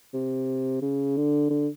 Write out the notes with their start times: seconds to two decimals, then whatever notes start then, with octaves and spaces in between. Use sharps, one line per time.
0.14 C3
0.82 C#3
1.17 D3
1.50 D3